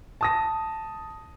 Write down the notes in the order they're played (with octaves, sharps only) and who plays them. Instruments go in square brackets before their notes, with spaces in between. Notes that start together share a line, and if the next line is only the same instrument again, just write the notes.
[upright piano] A5 D#6 A#6